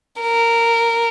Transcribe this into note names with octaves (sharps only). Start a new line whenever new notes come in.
A#4